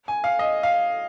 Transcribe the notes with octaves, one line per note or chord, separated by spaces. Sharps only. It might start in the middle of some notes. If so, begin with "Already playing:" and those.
G#5
F5
D#5
F5